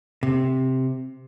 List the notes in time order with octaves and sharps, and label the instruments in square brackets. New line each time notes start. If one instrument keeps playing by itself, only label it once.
[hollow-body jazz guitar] C3